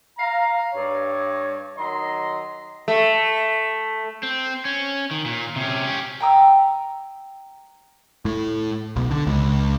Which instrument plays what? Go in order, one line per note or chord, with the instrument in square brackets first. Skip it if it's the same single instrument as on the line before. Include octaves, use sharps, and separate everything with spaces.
[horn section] F5 A#5
G2 C#5
D#3 F#3 D#5 A#5 C6
[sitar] A3
[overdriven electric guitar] C4
C#4
D#3
A#2
C3 C#4
C#4 G4
[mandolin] G5 A#5 D#6 E6
[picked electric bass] A2
B1
D3
C#2